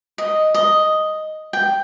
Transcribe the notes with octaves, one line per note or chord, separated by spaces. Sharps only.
D#5
D#5
G5